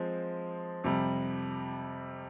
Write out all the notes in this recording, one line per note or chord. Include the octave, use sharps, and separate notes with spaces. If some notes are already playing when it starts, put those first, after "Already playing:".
Already playing: F3 G#3 C4
F2 C3 G3